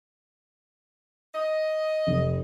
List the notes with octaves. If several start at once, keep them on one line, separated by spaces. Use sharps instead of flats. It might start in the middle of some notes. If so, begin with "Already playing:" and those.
D#5
F1